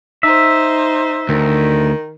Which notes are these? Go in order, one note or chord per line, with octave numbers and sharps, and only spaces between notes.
D#4 C5 E5
D2 D#3